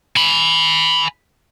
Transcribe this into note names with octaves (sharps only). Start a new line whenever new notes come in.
G#5 B5